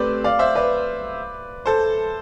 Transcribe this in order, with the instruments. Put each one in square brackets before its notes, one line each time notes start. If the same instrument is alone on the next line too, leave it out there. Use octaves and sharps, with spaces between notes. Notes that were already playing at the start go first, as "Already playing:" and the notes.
Already playing: [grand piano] A3 C4 G4 B4 C5 D5
D5 F5
C5 E5
B4 D5
A4 C5